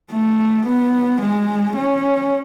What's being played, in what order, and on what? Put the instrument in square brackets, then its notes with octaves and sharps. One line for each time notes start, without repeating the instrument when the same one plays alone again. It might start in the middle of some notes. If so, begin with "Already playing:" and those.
[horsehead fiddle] A3
B3
G#3
C#4